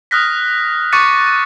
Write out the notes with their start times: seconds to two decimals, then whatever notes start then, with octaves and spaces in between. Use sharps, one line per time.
0.11 D#6 F6 F#6 A#6 B6
0.92 C#6 D6 F#6 A6 C#7 D#7